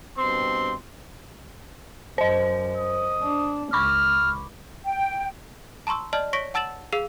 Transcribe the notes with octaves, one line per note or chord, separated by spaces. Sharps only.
G2 B2 C4 C6
F#2 C5 D#5
D#6
D4
C#2 B5 C#6 D6 F6
G5
A5 A#5 C6 C#6 E6
D5 D#5 A5 F6 F#7
C#5 C#6 A#6 B6 D7
F#5 A5 E6 A6 E7 F#7
G#4 F5 E6 C7 F7